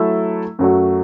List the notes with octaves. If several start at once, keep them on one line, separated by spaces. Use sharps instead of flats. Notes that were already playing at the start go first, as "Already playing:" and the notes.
Already playing: F#3 A3 E4 A4 E5
F#2 F#3 A3 F#4